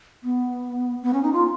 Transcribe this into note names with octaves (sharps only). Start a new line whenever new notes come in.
B3
B3
C#4
D#4
F4